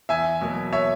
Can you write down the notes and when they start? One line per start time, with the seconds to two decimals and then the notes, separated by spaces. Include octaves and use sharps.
0.09 E2 E5 G#5
0.41 B2 F#3 A#3
0.73 C#5 E5